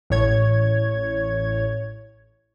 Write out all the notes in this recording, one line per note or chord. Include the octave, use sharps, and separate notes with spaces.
A1 A2 C#5 G#6